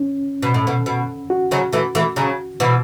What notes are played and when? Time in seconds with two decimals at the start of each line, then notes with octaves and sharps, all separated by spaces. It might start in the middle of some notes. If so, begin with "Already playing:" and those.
Already playing: C#4
0.43 B2
0.54 A2
0.67 B2
0.86 B2
1.30 F#4
1.51 C#3 F#3
1.73 E3 A3
1.95 E3 A3
2.16 C#3 F#3
2.60 B2 E3